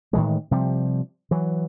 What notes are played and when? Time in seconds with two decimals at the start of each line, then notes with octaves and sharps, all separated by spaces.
0.13 A2 D#3 E3 G#3
0.51 C3 F3 G3
1.31 E3 F#3